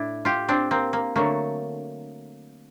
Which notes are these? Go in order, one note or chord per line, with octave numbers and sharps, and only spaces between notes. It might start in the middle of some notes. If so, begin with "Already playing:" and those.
Already playing: A2 D4 E4
F4 G4
C4 D4
A#3 C4
A#3
D3 F#3 A3 A#3